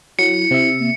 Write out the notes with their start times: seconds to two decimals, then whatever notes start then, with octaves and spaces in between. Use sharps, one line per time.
0.19 F#3 E4 C#7
0.51 C3 E5
0.79 A#3